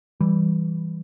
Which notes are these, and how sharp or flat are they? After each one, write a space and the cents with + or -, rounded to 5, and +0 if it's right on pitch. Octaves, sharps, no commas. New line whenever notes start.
E3 +0 G3 +0